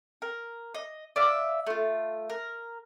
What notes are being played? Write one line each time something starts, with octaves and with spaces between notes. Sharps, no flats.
A#4
D#5
D5 E5 F5
A3 F4
A#4